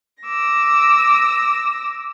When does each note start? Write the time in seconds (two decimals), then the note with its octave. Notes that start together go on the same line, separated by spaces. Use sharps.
0.25 D6 E6 A#6